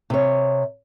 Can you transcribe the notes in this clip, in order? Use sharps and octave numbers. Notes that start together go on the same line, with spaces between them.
C3 C#5